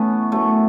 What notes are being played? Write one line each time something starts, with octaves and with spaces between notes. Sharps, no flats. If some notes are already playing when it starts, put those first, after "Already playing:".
Already playing: A2 E3 A3 B3 C#4
F#2 E3 A3